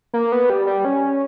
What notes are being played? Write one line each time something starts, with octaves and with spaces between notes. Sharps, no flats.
A#3
B3
G3
G3
C#4